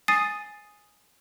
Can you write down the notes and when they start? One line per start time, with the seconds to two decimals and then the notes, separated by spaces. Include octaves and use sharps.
0.08 G#5 D#6 A6 C7 D#7